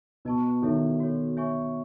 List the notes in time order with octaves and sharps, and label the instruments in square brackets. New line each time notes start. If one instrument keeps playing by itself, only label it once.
[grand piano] B2 [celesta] B4 D#5 A5 C#6
[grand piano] D#3 [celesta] E4 A4 C#5 E5
[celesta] F#4 A4 C#5
C#5 E5 G#5 C#6